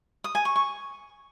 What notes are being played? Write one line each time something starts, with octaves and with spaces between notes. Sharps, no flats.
D#6
G#5
C#6
C#6